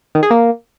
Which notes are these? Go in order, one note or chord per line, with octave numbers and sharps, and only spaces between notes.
D#3
G#4
A#3